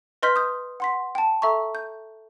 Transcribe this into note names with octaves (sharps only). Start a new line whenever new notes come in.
B4 D#5 C6 F6 G6 B6
D#6 G6
F#5 C6 B6
G5 A5
A4 E5 A#5 C#6
G6